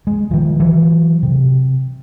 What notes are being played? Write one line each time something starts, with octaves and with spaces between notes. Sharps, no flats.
G#3
D#3 F3
E3 F#3
C3